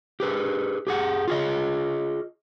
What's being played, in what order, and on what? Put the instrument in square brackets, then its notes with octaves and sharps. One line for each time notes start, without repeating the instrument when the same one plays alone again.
[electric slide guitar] G4 G#4 B4
G4 G#4 F#5
F4 G#4 D#5